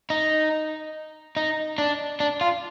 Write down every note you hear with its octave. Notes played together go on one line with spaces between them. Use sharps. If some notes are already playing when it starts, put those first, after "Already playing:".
D#4
D#4
D4
D4
F4